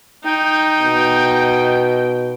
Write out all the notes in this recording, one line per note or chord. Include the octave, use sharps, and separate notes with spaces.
D#4 G5
B2